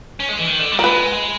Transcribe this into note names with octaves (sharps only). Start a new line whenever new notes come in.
C#4
G#3
E3
D#3
D3
G3
A#4
G#3 B4